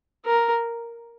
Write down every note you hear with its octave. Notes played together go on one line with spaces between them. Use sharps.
A#4